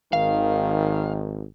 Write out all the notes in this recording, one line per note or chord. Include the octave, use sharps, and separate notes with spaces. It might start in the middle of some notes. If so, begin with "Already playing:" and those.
G#1 D#3 F5